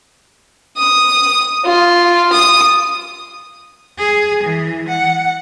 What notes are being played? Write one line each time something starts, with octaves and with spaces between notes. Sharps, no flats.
D#6
F4
D#6
G#4
E3
F#5